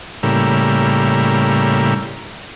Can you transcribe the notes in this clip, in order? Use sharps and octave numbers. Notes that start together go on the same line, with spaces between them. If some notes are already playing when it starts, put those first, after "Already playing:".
A2 C#3 G3 A#3 E4